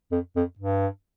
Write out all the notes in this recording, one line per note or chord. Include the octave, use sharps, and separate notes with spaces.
F2
F2
G2